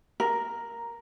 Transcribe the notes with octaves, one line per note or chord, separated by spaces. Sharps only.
A#4